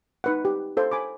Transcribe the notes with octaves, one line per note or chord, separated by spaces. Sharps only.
D#4 B4 F#5
G4
A4 C5 F5
G#5 B5 D6